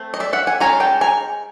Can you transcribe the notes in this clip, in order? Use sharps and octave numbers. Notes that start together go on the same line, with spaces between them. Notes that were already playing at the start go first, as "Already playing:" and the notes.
Already playing: A3 C4
D#5
D5 E5
E5 F#5
F#5 G#5
G#3 C#4 F4 G#5 A#5
G5 A5
G#5 A#5